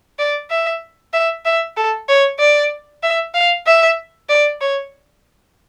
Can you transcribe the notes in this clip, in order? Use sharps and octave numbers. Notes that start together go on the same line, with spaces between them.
D5
E5
E5
E5
A4
C#5
D5
E5
F5
E5
D5
C#5